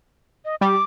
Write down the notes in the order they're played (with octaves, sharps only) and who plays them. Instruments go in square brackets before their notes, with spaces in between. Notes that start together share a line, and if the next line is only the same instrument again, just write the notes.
[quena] D#5
[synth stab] G3 [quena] D6